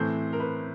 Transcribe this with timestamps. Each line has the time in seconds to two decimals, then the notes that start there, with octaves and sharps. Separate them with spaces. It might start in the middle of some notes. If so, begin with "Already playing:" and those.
Already playing: A2 E3 A3 C4 C5
0.33 A#4
0.40 B4